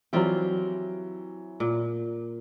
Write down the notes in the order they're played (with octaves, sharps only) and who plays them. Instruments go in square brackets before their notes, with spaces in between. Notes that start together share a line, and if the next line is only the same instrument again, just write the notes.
[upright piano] E3 F#3 [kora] G3 C4 F4
[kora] A#2